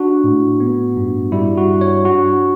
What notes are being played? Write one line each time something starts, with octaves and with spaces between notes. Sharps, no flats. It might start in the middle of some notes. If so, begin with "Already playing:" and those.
Already playing: D4 F#4
A2
B3
G2
G3 E4
F#4
G2
C#5
D4 F#4